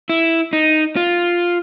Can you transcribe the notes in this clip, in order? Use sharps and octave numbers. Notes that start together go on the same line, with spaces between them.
E4
D#4
F4